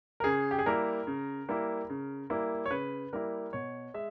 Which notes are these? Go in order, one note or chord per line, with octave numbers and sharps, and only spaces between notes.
A#4
C#3 G#4
G4
G#4
G3 A#3 E4 A#4
C#3
G3 A#3 E4
C#3
G3 A#3 E4
C#5
C#3 B4
G3 A#3 E4 A#4
B2 C#5
G#3 E5